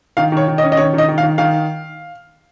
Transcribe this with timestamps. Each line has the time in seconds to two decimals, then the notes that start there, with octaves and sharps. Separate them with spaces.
0.17 D#3 F5
0.32 D#3 C#5
0.48 D#3
0.58 D#5
0.63 C#4
0.72 D#5
0.77 D#3 C#5
0.93 D#3 D#5
1.08 D#3
1.18 F5
1.23 D#3
1.38 D#3 F5